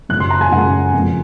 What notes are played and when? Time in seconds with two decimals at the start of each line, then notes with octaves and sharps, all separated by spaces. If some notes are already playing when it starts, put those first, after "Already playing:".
0.09 F#2 C#3 G#3 F#6
0.20 C6
0.30 A#5
0.41 G#5
0.52 F#2 C#3 G#3 F#5
0.93 F2 C#3 G#3